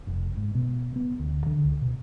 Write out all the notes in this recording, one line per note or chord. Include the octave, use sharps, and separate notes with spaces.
F1
G#2
B2
B3
D2
D3
C#2
B2